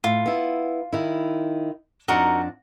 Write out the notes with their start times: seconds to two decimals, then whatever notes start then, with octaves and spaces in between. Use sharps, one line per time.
0.04 A2 F4
0.26 B3 E4
0.93 D#3 E4
2.08 F2 D4 D#4 F#4 A#4 F#5